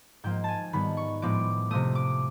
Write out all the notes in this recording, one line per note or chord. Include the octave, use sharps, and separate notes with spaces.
G#2 F3 A#3 G5
G#5 A5
G#2 D#3 G3 B3 B5
C#6
A2 F3 G#3 B3 D6
C3 F3 A3 D#6
D6